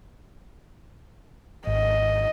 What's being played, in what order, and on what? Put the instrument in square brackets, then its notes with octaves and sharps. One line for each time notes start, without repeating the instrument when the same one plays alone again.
[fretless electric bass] G#1 [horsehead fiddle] D#5